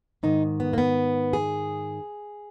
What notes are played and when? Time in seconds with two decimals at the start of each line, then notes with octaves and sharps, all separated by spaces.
0.23 G#2 D#3 D#4
0.60 B3
0.73 A#3
0.78 B3
1.33 G#4